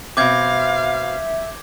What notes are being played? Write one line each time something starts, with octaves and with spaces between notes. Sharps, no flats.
B2 C4 E5 F5 D6 G6 G#6